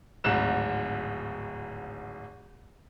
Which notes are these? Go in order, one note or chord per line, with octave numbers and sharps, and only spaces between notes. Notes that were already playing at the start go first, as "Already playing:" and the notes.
D1 G#1 G#2 F#6 E7